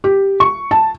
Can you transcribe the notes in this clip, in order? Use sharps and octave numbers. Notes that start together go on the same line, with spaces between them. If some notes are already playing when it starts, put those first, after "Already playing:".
G4
C#6
A5